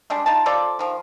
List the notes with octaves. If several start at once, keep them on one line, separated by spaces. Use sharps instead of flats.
G3 G#3 D4
D#4 F4 A5
F3 F4 A4 D5
D#3 F3